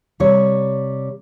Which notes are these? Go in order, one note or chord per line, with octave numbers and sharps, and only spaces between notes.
C3 G3 C#5